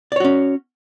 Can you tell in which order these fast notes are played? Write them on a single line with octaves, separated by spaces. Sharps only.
D5 C#5 F#4 C#4